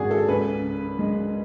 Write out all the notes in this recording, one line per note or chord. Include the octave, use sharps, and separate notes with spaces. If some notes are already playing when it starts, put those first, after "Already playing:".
Already playing: G#1 C#3 F#4 G#4 D5
A4
C#2 B4
C#3
G#3